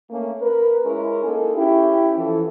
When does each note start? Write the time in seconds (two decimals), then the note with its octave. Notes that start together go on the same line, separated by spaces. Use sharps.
0.10 A3 A#3 C#4
0.41 A#4 B4
0.84 G#3 C#4 E4 A#4
1.24 A#3 D#4 G#4 A4
1.55 C#4 E4 G4
2.16 E3 F3 A4